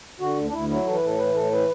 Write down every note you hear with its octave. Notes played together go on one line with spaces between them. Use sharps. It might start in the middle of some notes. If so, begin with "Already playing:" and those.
D3 F#4
D2
D4
D2 E4
F#3 E4
E3 A4
B4
A2 A4
E3 B4
A2 A4
E3 B4